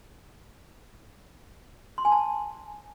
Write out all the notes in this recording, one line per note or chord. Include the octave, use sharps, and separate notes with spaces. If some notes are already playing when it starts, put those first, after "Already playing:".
C6
G#5
A5